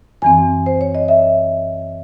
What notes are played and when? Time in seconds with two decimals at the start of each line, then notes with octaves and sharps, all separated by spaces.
0.22 F#2 E3 C4 G#5
0.66 C5
0.81 C#5
0.95 D#5
1.08 E5